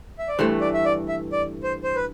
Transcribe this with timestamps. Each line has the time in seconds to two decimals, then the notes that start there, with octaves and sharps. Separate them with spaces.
0.19 E5
0.28 D5
0.38 G2 E3 A3 C5
0.61 D5
0.74 E5
0.85 D5
1.08 E5
1.33 D5
1.63 C5
1.84 C5
1.96 B4